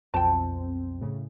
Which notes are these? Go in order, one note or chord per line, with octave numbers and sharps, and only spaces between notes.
B1 F2 C4 G5 A5
A2 C#3